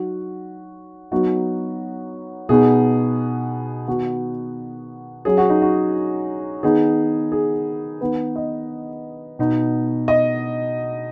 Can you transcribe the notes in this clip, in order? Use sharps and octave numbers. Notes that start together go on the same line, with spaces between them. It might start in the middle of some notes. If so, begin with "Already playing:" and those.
Already playing: F#3 D#4 F#4
F#3 B3 D#4 F#4
B2 B3 D#4 G#4
D#3 B3 D#4 F#4
F#3 C#4 G#4
F#4
D#4
F#4
D#3 B3 D#4 G#4
G#4
D#3 B3 D#4 B4
D#5
B2 B3 D#4
D#5